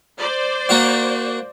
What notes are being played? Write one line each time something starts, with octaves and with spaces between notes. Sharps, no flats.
C5 D5
A#3 F#4 F5